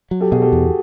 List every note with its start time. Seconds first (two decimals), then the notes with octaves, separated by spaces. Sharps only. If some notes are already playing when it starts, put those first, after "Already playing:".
0.11 F#3
0.21 G4 A4
0.31 B2 F#4 G#4
0.42 G4 A4
0.52 E2